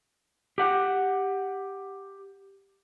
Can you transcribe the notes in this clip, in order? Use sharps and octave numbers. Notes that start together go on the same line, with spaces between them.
G4 F#5